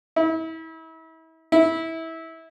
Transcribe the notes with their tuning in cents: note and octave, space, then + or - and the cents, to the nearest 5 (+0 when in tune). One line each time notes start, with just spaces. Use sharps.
E4 -35
E4 -20